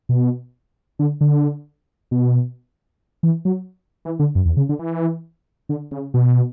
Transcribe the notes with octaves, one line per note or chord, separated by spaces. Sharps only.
B2
D3
D3
B2
E3
F#3
E3
D3
F#2
E2
C#3
D3
E3
D3
C#3
B2